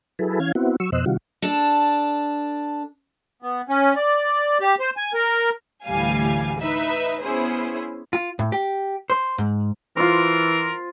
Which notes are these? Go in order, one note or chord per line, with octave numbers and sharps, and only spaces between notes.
F#3 E4 G#4 A4 B4
E3 C#4 F5 G#6
B3 C4 E4 F#4
F#3 C#6 E6
F2 B2 C5 D#5 E6 F#6
C3 D#3 G3 F4 F#4
D4 A4
B3
C#4
D5
G4
C5
G#5
A#4
D2 A2 E3 G3 F5 G#5
D#4 B4 E5
B3 C#4 E4 G#4 C5
F4
A2
G4
C5
G#2
E3 F4 A#4 C5